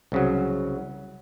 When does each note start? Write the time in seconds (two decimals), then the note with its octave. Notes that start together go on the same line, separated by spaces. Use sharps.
0.12 C2 C#3 F#3